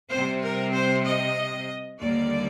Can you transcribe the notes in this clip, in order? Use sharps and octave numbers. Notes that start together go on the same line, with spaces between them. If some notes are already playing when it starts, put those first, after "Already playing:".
C3 G3 C4 C5
A#4
C5
D#5
D#2 D3 G3 A#3 D5